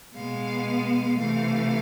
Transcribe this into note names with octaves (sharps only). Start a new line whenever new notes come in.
B2 G#3 B3 F5
C3 E3 A3 F5